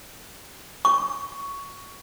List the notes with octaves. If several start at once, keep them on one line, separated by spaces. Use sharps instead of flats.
C#6